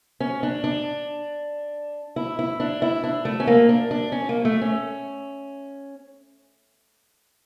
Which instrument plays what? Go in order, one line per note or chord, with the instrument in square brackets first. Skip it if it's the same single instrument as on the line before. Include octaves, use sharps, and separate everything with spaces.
[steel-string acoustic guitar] C#4
D4
D4
E4
E4
D4
E4
D4
A3
C#4
A#3
D4
D4
C#4
A#3
A3
C#4